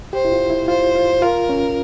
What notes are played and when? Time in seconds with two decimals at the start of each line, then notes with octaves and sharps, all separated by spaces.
0.13 G4 C5
0.25 E4
0.32 F4
0.50 E4
0.68 F4 C5
0.95 F4
1.22 F4 A#4
1.49 C#4